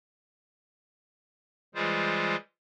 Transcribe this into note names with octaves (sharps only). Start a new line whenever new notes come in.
E3 G3 G#3 F4 G#4 C5